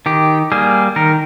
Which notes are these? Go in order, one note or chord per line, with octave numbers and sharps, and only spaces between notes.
D#3 G4
G3 A#3 G#4
D#3 A#4